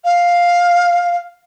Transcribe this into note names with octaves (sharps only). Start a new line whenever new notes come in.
F5